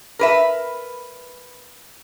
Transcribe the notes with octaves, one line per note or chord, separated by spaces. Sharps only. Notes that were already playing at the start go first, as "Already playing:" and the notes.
A#4 B4 E5